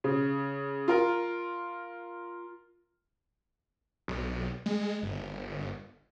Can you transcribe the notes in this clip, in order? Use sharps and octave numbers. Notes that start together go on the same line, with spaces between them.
C#3
F4 A#4
B1
G#3
G1